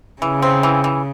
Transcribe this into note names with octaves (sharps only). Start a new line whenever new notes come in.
C#3 E3
C4
E3
E3